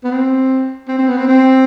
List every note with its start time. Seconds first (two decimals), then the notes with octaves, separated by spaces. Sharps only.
0.04 B3
0.11 C4
0.88 C4
0.98 C4
1.08 B3
1.17 C4
1.28 C4